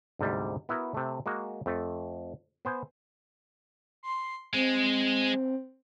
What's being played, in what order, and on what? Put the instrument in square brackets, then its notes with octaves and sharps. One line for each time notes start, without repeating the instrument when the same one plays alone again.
[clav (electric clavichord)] D2 G#2 C3 G3
B3 E4 F#4 A#4
C3 A3
G#3 A#3 F#4
F2 A3
B3 C5 G#5
[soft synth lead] C6
[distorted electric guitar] G#3 [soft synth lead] C4